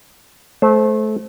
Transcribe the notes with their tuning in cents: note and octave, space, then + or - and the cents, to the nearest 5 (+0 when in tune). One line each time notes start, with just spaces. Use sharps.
A3 -25 C5 +0